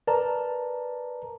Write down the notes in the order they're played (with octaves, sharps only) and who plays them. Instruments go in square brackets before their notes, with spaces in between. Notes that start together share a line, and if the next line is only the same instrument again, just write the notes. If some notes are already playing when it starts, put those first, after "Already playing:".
[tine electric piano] A#4 B4 D5 A5 A#5